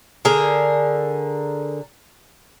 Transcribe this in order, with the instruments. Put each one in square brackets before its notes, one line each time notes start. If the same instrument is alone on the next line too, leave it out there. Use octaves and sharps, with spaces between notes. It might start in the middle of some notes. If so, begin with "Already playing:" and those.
[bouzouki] D3 G#4 A#4